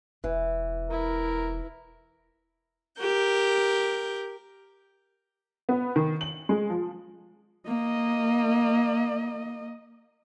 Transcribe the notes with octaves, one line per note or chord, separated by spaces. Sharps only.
E1 E3
E4 A#4
G4 A#4 G6
B3
D#3
F#7
G#3
F3
A#3 D#5